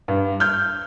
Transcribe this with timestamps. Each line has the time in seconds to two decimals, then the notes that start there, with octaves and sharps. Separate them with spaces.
0.08 G2
0.40 F6 G6